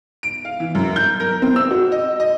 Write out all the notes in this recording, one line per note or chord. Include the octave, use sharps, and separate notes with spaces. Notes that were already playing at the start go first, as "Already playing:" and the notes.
D7
F5
E3
F#2
G6
A#4
C4
E6
F#4
D#5
D#5